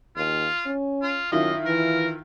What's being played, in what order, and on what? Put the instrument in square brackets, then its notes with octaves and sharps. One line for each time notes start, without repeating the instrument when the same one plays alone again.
[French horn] D#2 [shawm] F4
[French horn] C#4
[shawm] F4
[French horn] F#2 [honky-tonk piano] D#3 E4 F4 [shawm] D#5
[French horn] E3 [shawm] A#4